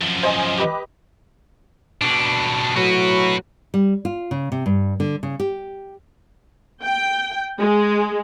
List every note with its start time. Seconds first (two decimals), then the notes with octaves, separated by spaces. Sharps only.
0.01 F#2 F3
0.23 C5 D#5 G#5
0.58 G4 B4 D#5
2.01 B2 D4
2.76 A2 F#3 F#4 B4
3.74 G3
4.05 F4
4.31 C#3
4.52 C3
4.66 G2
5.00 D3
5.23 C#3
5.40 G4
6.83 G5
7.59 G#3